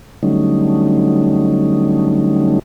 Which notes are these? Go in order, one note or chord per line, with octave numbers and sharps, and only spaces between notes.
D3 F#3 G3 A3 C#4 D#4